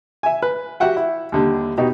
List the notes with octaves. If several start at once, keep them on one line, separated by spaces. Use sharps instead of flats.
E5 G#5
B4
F#4 G4 E5 F#5 G5
E4
D#2 D3 G3
B2 D#4 F#4 G4